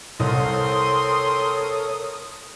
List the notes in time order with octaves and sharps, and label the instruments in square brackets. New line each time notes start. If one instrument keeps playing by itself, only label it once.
[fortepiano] C2 [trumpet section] C4 C6 [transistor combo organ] A4 A#4 C#5 [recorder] D#6